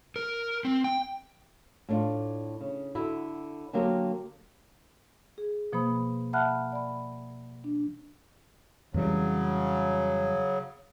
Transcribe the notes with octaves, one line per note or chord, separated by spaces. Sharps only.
A#4
C4
G5
A2 D4 F4
C#3
D3 E4 F#4
D3 F#3 A#3 C4 G4 A#4
G#4
B2 F3 A#3 C5 B5 D#6
E5 F#5 A5 B5 F6 F#6
D5 B5
D4
F2 C#3 E3 F#3 G3